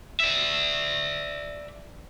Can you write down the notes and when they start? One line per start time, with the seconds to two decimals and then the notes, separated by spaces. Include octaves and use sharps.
0.20 D5 E5